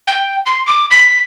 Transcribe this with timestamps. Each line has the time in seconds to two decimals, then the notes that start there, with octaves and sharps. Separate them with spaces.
0.07 G5
0.46 C6
0.67 D6
0.91 B6